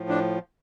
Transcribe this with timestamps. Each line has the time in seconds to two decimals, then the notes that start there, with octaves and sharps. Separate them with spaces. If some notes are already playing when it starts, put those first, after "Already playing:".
Already playing: A2 F3
0.09 D4